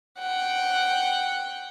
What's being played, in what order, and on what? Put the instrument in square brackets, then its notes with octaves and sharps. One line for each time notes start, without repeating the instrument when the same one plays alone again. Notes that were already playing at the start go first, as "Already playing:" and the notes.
[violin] F#5 G5